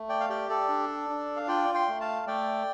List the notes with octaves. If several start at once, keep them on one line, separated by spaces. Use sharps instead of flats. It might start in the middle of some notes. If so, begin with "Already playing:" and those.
Already playing: A3
D5 G5
F5
G4 D5 G5
A4 D5
D4
D4
F5
F4 D5 G5
G5 C6
A3
F5 A5
A3 D5 G5